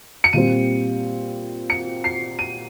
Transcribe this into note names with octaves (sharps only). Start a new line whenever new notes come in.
C#7
A#2 G3 C4 D#7
C#7
C7
D#7